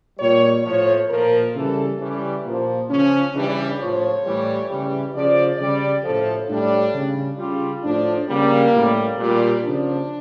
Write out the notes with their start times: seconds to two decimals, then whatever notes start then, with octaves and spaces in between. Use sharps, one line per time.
0.19 A#2 G3 C#5
0.64 A2 F3 C#5
1.09 A#2 F3 A#4
1.54 C#3 E3 G3 A4
1.99 C#3 E3 G3 C#4
2.44 A#2 F3 A#3
2.89 C#3 F3 C#4
3.34 C#3 E3 G3 D4
3.79 A2 F3 C#5
4.24 A2 E3 G3
4.69 C#3 E3 G3
5.14 C#3 F3 D5
5.58 C#3 G3 D5
6.04 A2 F3 A4
6.49 A2 G3 D4
6.94 C#3 G3
7.38 C#3 G3 F4
7.83 A2 F3 D4
8.29 C#3 G3 A#3
8.74 A2 G3
9.18 A#2 G3
9.64 C#3 F3 D4